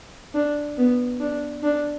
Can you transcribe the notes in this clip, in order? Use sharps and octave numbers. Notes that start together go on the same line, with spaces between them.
D4
B3
D4
D4